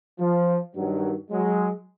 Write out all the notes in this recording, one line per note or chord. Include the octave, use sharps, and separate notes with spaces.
F3
G2 D#3 F#3
F#3 G#3